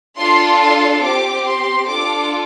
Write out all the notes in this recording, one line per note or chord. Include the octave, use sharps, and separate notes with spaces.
D4 F4 A4 C6
C6
C4 G4 D6
C6
D4 F4 A4 D6